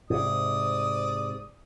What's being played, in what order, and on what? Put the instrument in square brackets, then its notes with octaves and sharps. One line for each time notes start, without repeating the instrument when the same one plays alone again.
[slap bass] G#2 C3 [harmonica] D5 D#6